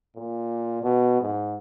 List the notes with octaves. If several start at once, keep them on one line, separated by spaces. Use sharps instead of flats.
A#2
B2
G#2